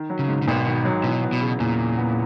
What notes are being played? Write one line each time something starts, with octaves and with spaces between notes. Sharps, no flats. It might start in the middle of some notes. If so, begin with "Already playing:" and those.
Already playing: D#3
F#3
C#3
G#2
C#3
G#1 B2
D#3
F#3
B2 E3
B3
B2
C#3
E2 A#2
E3
B3